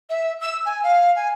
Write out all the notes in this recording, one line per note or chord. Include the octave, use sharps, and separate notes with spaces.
E5
E6
G#5
F5
G#5